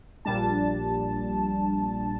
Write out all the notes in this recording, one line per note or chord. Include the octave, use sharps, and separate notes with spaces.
A#1 A#2 G3 D4 A5